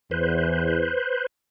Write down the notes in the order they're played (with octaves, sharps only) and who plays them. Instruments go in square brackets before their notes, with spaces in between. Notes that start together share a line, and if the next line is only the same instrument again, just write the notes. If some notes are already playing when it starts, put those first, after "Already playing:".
[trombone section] E2 [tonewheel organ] B4 C5